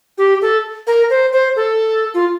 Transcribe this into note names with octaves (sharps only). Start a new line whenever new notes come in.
G4
A4
A#4
C5
C5
A4
F4